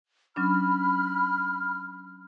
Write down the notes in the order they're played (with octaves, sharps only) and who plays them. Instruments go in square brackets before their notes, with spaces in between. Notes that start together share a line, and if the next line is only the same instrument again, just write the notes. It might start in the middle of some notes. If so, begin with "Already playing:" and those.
[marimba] F#3 C#4 D4 [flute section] B5 F6